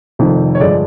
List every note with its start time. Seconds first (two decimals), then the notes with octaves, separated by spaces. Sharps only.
0.19 F1 F2 C3 D#3
0.55 C#5
0.60 G2 D3 F3 G#3 D5